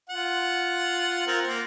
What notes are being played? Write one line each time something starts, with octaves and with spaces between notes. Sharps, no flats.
F4 F#5
C4 F4 A#4
A#3